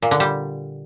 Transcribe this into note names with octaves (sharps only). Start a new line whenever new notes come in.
A#2
D3
G3